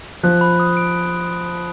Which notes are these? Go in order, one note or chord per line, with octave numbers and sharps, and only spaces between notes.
F3 F#6
B5
D#6
D7